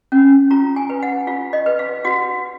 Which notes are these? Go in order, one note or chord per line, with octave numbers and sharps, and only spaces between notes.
C#4
F4 A#5
G#5
B4
F#5
F4 F5
D#5
B4
F5
F#4 F#5